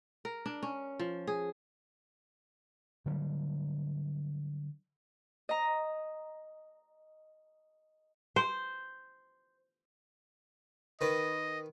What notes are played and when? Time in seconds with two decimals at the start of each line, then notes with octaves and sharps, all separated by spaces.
0.25 A#4
0.46 D4
0.63 C#4
0.99 F3
1.27 G#4
3.06 D3 F#3 G3
5.49 D#5 A#5
8.36 C5
11.01 D#3 B4 D#5